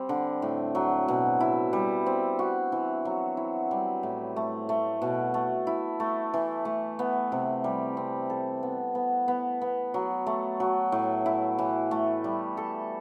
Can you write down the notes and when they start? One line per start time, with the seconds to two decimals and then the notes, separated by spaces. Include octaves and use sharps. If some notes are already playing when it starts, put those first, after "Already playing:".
Already playing: G3 C4
0.09 D3
0.42 A2
0.75 F#3
1.08 B2
1.40 E4
1.73 G3
2.06 C4
2.39 F#4
2.72 E3
3.05 F#3
3.37 E4
3.71 G3
4.03 A2
4.36 A3
4.69 A3
5.02 B2
5.34 A3
5.67 E4
6.00 A3
6.34 E3
6.65 A3
6.99 B3
7.32 C3
7.64 G3
7.97 C4
8.30 A4
8.63 B3
8.95 B3
9.28 B3
9.62 B3
9.94 F#3
10.26 A3
10.60 F#3
10.92 A2
11.26 E4
11.59 E3
11.91 A3
12.24 G3
12.57 A4